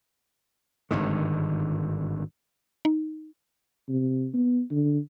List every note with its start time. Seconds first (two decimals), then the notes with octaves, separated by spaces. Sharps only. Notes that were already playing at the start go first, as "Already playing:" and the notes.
0.91 G#1 G2 D3 D#3
2.85 D#4
3.89 C3
4.34 B3
4.71 D3